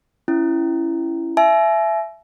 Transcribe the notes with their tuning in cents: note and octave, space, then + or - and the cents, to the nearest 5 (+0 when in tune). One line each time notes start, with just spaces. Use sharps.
C#4 +0 E4 +20
E5 +15 G#5 +45